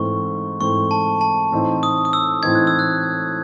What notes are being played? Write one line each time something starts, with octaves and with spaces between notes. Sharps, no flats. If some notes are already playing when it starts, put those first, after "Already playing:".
Already playing: G#2 E3 A3 C4 C#6
G#2 E3 A3 C4 C#6
A5
A5
A2 E3 C4 D#4
D#6
D#6
E6
A2 E3 C4 D#4 G#6
F#6
E6
F#6